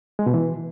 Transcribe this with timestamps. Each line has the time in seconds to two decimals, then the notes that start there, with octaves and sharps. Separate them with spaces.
0.19 G#3
0.26 B2
0.34 E3